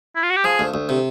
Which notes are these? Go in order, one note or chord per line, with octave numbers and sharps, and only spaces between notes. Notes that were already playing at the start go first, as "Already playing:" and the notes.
E4
F4
F#4
G4
F3 G#4
D2
D2
C3